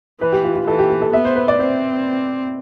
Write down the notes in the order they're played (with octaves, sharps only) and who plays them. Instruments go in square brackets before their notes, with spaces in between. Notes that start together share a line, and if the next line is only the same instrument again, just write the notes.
[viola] E3 [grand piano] B4
[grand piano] G4
F4
F4
[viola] E3 [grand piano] A4
[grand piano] G4
G4
A4
[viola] B3 [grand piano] E5
[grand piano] C5
B4
D5
[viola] C4 [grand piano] C5